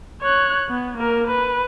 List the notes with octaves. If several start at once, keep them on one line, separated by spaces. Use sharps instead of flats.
C#5 F#6
B3
A#3 A#4
B4